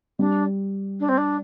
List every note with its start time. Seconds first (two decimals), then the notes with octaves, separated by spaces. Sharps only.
0.19 G3 D4
1.00 D4
1.09 C4
1.18 D4